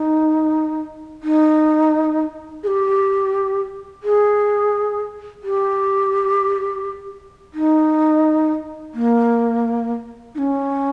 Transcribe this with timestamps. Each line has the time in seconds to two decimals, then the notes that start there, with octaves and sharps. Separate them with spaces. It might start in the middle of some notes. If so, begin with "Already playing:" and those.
Already playing: D#4
1.23 D#4
2.63 G#4
2.67 G4
4.03 G#4
5.43 G4
7.54 D#4
8.94 A#3
10.35 D#4
10.38 C#4